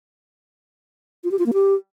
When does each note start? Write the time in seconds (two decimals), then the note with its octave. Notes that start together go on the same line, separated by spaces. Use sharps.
1.24 F4
1.31 G4
1.39 F4
1.46 A#3
1.54 G4